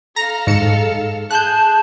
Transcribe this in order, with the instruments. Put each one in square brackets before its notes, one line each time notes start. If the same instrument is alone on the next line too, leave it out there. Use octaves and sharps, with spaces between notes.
[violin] A4 F5 [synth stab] A#5 A#6
[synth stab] G#2 C#7 E7
[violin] G#4 [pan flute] A5 [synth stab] F#6 G6